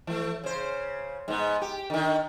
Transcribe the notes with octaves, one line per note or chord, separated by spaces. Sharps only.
E3 A3
C#3 C5
G#2 B3
G4
D3 D#3